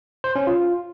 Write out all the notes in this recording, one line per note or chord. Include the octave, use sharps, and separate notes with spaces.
C5
C#4
F4